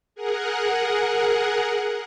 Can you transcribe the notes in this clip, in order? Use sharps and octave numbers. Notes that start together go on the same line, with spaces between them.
G#4 A#4 F#5